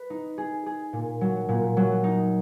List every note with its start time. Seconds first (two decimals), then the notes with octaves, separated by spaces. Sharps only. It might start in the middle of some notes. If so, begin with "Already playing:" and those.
Already playing: B4
0.10 D#4
0.38 G#4
0.66 G#4
0.93 A#2
1.21 F#3
1.49 A#2
1.77 F#3
2.04 D#4